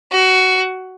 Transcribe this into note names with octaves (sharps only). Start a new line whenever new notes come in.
F#4